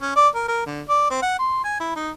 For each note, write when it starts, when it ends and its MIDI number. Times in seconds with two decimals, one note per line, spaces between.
0.01 0.15 61
0.16 0.28 74
0.35 0.44 70
0.48 0.63 70
0.66 0.82 50
0.89 1.06 74
1.10 1.21 60
1.22 1.39 78
1.39 1.59 84
1.64 1.79 80
1.80 1.94 64
1.96 2.10 63